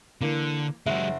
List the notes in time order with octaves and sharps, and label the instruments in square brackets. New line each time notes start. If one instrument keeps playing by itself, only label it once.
[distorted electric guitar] D3 [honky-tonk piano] E3 A#3
[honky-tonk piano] F#1 [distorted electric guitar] F#3 G#3 [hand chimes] E5 F#5